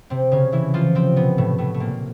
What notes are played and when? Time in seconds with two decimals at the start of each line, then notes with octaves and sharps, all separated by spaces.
0.10 C3 C4
0.32 C#3 C#4
0.52 E3 E4
0.74 F3 F4
0.95 C3 C4
1.16 B2 B3
1.38 A2 A3
1.58 A2 A3
1.74 A3
1.80 A#2 A#3